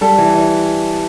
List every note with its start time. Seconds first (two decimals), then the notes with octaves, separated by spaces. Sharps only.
0.01 G3 A4
0.18 E3
0.35 E3